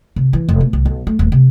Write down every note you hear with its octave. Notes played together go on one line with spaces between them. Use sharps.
C3
E3
F1
B2
C2
B1
A3
D#1
C3